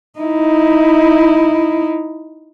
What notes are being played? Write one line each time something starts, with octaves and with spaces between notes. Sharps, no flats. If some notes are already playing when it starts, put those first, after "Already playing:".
D#4 E4